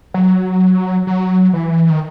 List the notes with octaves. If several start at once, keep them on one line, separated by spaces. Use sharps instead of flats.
F#3
F#3
E3
D#3